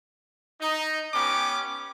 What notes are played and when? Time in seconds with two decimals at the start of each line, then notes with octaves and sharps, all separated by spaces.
0.61 D#4
1.14 B3 C#4 G4 D6